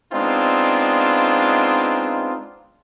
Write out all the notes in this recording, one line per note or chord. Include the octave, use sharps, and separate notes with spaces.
G#3 B3 C4 D4 D#4 F4